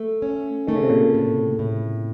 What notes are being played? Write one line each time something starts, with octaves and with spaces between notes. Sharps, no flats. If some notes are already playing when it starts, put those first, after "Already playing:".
Already playing: A3
C#4
D#3 A3
C#3
C3
A#2 C#3
A2
A2